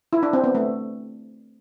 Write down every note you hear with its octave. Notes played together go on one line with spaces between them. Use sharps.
E4
D4
C4
B3
A3